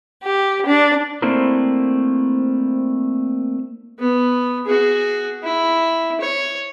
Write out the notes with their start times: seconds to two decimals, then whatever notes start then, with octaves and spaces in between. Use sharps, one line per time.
0.23 G4
0.65 D4
1.22 A3 A#3 C4 D4 E4 A#4
3.99 B3
4.66 F#4 G#4
5.43 E4
6.21 C#5